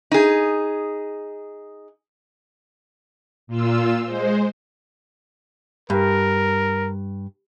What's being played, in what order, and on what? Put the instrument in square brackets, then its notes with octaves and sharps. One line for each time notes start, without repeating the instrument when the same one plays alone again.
[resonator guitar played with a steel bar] D#4 G#4
[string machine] A#2 F4 E6
G#3 C5
[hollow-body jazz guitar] G2 [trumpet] A#4